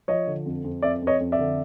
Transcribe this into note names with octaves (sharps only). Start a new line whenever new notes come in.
F3 C#5 D#5
D3
F2
F2
F2 D5 E5
F2
C#5 D#5
F2
D5 E5
D3